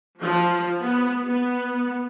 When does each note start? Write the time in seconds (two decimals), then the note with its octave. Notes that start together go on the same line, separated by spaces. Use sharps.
0.20 F3
0.83 B3
1.25 B3